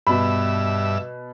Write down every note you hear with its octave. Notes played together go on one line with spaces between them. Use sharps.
G2 B2 E5 B5